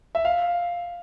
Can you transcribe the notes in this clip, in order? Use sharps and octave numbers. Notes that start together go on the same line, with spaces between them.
E5
F5